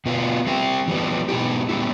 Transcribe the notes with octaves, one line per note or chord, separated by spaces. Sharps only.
B2 B3 F4
G3 C4 G4
E3 G3 B3
B2 B3 E4 G4
G3 B3 E4